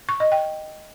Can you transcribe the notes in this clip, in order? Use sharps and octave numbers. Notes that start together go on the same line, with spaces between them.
C#6
D#5
G5